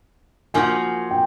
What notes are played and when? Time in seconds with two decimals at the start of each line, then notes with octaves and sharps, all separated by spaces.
0.54 F3 A#3 D#4 F#4 G#5
1.11 G5